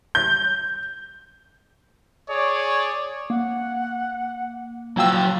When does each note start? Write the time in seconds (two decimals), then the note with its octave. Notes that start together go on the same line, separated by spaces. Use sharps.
0.15 G6
2.30 G#4 C#5 D5
3.30 A#3 F#5
4.97 A#2 F#3 F#4 F5 G5 E6